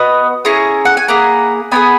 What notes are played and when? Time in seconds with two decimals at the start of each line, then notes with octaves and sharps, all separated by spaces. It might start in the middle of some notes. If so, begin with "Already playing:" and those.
Already playing: B3 F#4 B4 D#5
0.45 C#4 E4 G#4 A#5 C#6
0.85 F#5
0.97 G#5
1.08 A#3 E4 G#4 F#5 A#5
1.71 B3 E4 G#4 G#5 B5